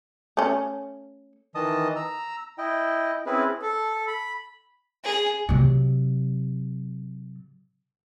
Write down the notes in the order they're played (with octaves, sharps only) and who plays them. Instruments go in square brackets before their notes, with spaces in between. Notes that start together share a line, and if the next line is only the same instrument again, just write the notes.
[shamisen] A3 C#4
[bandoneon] D#3 E3 D#5 A5 D#6
A#5 E6
E4 D#5 G5
C4 C#4 E4 G#4 B4
[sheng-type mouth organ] A4
B5
[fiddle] G#4
[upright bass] C3 F#3